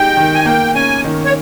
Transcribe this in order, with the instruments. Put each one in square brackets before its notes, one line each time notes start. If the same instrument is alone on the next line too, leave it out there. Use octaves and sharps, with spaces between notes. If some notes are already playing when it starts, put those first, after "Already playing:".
Already playing: [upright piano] G#3 D#4 G4 [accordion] G5
[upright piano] D#3
[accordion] G#5
[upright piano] A#3 [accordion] G5
[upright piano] C#4 [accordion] G#5
[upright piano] D#3
[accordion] C#5